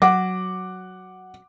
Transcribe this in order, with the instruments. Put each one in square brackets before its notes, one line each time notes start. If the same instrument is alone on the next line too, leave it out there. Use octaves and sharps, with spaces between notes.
[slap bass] F#3 [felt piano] F#5 D6